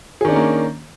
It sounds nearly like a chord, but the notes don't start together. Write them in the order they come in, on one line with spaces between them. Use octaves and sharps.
G#4 D#3 D4 C#4 A#3